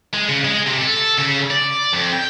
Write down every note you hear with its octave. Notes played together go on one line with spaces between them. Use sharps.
G#3
C#3
G#3
C3
A4
C#3
D5
F2
G5